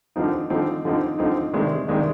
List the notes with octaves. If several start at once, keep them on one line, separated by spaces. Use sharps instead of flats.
D3 F3 C4 D#4
D3 F3 C4 D#4
D3 F3 C4 D#4
D3 F3 C4 D#4
C3 D#3 G#3 D4
C3 D#3 G#3 D4